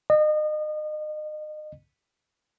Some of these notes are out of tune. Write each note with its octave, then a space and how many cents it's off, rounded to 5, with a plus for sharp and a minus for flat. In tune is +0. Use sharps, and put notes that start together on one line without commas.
D#5 -30